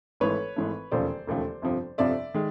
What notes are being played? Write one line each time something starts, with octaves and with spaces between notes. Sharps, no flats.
G#1 G#2 E3 A3 B4 C#5
G#1 G#2 E3 A3
E1 D#2 C#3 F3 A3 C5 D5
E1 D#2 C#3 F3 A3
G1 F2 C3 F3
G1 F2 C3 F3 D5 E5
D#3 G#3